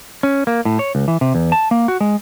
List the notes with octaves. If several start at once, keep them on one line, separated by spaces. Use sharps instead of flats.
C#4
A#3
A2
C#5
C#2
E3
C3
E2
A5
A#3
F#4
G#3